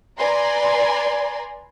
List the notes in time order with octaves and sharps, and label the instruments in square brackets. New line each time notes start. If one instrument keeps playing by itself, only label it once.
[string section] B4 D5 G#5 A#5 C6